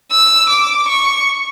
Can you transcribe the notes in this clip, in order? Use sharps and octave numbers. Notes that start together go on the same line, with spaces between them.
E6
D6
C#6